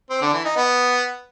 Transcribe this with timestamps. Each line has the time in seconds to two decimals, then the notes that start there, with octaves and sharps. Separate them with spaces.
0.10 C4
0.22 D3
0.33 E3
0.45 D#4
0.56 B3